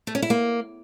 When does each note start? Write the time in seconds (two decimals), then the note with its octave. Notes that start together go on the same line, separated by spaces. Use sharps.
0.07 A3
0.15 C#4
0.22 E4
0.30 A#3